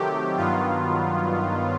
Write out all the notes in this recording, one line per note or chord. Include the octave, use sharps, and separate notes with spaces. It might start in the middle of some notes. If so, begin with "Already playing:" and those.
Already playing: C3 D#3 F#3 A3 G4
G2 D#3 F#3 B3 F4